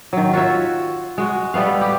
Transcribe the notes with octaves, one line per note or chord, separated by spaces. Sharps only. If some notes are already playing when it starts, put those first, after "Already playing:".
D#3 F#3
F4 F#4 C#5 E5
G#3 F#4
G3 A3 B3 F5
G4